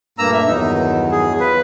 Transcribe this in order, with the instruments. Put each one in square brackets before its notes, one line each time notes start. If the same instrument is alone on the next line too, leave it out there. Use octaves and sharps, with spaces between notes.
[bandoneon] G2 A#3 [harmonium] A#2 A3 [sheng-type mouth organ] A#5 E6
[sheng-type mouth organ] E5
[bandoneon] E2 [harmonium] G2 D#3 F#3 [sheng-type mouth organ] D#4
[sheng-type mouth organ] G#4
[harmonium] F4 F5 [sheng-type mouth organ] B4